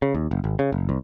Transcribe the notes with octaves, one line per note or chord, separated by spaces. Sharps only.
C#3
D#2
F#1
G#1
C#3
F#1
C2